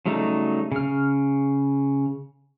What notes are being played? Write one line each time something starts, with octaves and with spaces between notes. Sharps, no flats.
C#3 F#3 G3 A3 D#4
C#3 F6